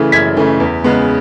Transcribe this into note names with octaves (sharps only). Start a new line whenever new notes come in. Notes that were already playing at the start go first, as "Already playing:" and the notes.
Already playing: C#3 E3 A3
F#2 G#6 B6
C#3 E3 A3
E2
C#3 G#3 B3